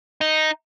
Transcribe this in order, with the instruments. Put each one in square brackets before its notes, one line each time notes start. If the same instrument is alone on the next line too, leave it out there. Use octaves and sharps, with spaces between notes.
[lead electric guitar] D#4